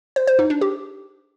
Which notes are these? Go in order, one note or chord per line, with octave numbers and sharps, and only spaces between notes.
C5
C5
D#4
D4
G4